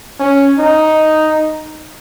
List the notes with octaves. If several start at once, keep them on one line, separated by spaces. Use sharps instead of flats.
C#4
D#4